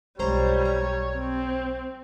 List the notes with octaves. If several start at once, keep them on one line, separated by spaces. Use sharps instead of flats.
B1 F2 G3 G#3 C5 C#5 A#5
A#5
C4